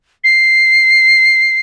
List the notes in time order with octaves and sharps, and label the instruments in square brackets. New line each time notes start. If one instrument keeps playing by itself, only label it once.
[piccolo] C7